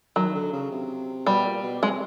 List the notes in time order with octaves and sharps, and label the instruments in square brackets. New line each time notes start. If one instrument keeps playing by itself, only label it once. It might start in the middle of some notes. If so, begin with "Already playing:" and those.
[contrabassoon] D#3 [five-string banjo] F#3
[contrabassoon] D3
C#3
C3
[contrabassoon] B2 [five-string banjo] G3
[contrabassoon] A#2
B2
[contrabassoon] C3 [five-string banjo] G#3